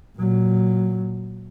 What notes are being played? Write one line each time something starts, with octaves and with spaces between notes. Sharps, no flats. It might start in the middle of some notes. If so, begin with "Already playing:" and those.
A#2 F#3